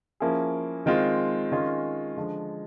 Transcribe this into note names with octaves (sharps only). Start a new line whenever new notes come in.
F3 A#3 C#4 E4 G#4
D#3 G#3 C4 F4
D#3 G#3 C#4 F4
D3 F3 G#3